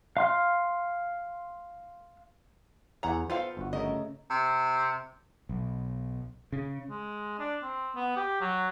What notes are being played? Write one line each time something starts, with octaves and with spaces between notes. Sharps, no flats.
F5 C6 F6
E2 F#5 G#5 A#5
B3 F4 A4 C5 F5 G5
G1 F#4
C#3 A3 A#4 D#5
C3
B1
C#3
G#3
D4
C4
B3
G4
F#3